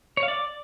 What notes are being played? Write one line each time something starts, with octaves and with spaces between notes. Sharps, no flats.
C#5
F5
D5